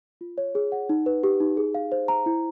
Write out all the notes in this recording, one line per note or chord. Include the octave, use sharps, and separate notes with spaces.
F4
C#5
G#4
F#5
D#4
B4
G4
D#4
G#4
F5
C5
A#5
E4